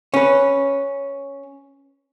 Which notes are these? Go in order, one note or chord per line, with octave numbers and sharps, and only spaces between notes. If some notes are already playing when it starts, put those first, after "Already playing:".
C#4 B4